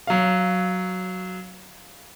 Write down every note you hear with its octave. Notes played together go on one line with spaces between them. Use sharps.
F#3 F5